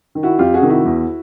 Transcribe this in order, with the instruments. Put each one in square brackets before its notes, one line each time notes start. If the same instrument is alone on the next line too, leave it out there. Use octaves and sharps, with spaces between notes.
[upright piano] D#3
E4 F#4
F2 F4 G4
F#4 G#4
C3 D#3
E4 F#4
E2